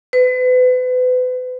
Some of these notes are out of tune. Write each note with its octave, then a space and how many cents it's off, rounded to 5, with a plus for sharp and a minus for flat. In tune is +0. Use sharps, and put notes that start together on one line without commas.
B4 +35